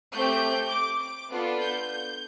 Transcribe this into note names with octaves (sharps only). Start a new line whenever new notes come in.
A3 C4 G4 G6
D6
D6
B3 D4 F4 A4
G6
G6